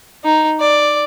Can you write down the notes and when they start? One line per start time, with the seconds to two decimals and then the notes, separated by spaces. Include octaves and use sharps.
0.24 D#4
0.60 D5